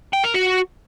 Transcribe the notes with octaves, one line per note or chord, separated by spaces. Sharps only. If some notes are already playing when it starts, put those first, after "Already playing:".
G5
A#4
F#4